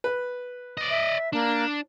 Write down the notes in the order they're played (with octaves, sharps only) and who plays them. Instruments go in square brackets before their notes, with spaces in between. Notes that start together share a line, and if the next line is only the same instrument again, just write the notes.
[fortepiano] B4
[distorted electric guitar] D5 D#5
[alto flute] E5
[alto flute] A#3 [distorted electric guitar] D4